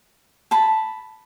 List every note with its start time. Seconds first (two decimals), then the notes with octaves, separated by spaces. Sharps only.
0.51 A5 B5